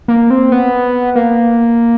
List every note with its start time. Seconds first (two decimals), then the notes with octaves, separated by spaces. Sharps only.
0.08 A#3
0.30 C4
0.52 B3
1.15 A#3